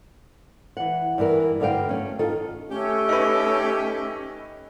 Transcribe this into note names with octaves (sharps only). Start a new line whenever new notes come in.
E3 F#5
G2 E3 A#4
G2 D3 F#3 F5 G5
A3 A#3 C#4
D#3 F4 A4
A3 C#4 G4
D#4 B4